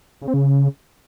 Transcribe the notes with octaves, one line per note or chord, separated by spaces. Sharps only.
C#3
C4
C#3